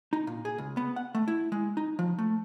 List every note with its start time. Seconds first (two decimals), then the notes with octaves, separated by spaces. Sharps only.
0.13 D#4
0.27 A#2
0.45 G#4
0.58 C#2
0.77 B3
0.96 F#5
1.15 A3
1.28 E4
1.52 G#3
1.77 D#4
1.99 F3
2.18 A3